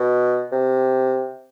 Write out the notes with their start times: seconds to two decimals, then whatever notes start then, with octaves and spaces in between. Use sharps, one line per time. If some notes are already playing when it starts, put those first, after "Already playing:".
Already playing: B2
0.52 C3